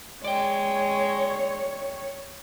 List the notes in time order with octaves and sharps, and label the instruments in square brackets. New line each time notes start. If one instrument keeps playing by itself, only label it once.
[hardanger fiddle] G#3 [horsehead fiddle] C#5 [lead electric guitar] D5 G5